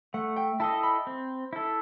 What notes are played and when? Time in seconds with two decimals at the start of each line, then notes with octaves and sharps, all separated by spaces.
0.14 A3 F#5
0.36 G5
0.60 E4 A4 D#5 A5
0.83 B5
1.07 C4
1.53 E4 A4